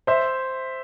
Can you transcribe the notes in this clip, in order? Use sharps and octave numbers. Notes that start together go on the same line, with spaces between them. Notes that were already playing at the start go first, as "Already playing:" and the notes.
C5 E5